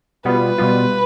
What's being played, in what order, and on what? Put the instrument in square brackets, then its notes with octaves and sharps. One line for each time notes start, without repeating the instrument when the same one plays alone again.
[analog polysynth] B2 G3 B3 F4 [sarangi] B4
[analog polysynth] B2 G3 B3 F4